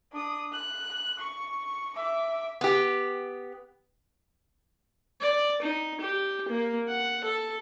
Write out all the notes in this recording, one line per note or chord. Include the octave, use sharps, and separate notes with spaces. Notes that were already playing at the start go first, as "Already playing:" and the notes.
D4 D#6
F#6
C#6
E5 D6
B3 G4
D5
D#4
G4
A#3
F#5
A4